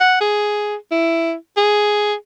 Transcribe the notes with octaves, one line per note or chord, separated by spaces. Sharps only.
F#5
G#4
E4
G#4